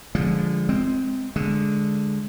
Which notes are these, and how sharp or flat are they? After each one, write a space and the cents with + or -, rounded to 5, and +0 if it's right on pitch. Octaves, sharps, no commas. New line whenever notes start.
D3 +0 F3 +0 G#3 -20
G#3 +20 C4 +0
D3 +0 G#3 +0